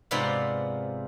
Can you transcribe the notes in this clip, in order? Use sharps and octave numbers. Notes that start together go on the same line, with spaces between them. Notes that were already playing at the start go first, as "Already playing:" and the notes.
G#2 C3 B3 F4 D5 B5